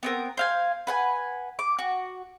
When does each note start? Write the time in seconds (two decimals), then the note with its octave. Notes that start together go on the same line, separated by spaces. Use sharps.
0.03 B3 C4 A#4
0.37 C5 F5 G#5
0.87 B4 F#5 G#5
1.59 D6
1.79 F#4